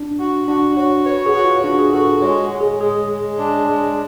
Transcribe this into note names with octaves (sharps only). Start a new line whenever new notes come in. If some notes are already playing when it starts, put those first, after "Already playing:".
Already playing: D4
F#4
D4 F#4
F#4 C#5
B4 C#5
G#4
F#4
F4
D4 F#4
G#4
F#4 A4
G#3 C#5
G#3
G#4
G#3 G#4
G#3
D4
G#3